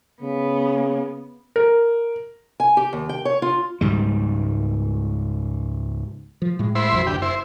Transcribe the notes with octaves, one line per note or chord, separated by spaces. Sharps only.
C#3 B3
A#4
G#5
G4
D#2
G5
C#5
F4
C#2 G#2 G3
F3
A2 G#3
E4 C5 B5
A#1 F2 F#3
F#1 D2 G4
E4 C5